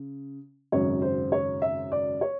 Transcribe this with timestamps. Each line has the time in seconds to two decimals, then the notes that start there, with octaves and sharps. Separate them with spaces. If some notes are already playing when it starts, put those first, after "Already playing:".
Already playing: C#3
0.72 G#1 F#2 C#3 C#5
1.02 C5
1.32 C#5
1.62 E5
1.92 D5
2.21 C#5